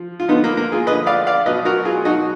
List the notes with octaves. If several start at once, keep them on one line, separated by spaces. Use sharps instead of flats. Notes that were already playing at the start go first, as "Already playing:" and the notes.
Already playing: F3
F4
D3 F3 B3 D#4
A#3
A#3
F4 G#4
D3 F3 B4 D#5
D5 F5
D5 F5
B2 F#3 B4 D#5
F#4 A#4
F4 G#4
B2 F#3 D#4 F#4